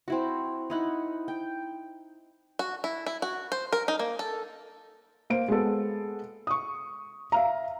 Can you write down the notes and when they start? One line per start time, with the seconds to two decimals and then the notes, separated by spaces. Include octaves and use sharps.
0.08 C4 E4 F#4
0.70 D#4 E4 F#5
1.28 G5
2.59 F#4
2.84 E4
3.06 E4
3.22 F#4
3.52 C5
3.73 A#4
3.88 D#4
3.99 A#3
4.19 A4
5.30 A#3 C5 D7
5.48 G#3 B3 A4
6.47 C#6 D#6
7.32 E5 F5 A#5